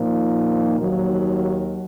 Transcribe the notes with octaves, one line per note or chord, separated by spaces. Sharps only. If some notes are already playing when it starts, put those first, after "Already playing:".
Already playing: A#2 F3 A#3 D#4
D#2 D#3 F#3